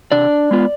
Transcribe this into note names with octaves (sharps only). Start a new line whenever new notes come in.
C3 D4 D5
G#3 B3 F4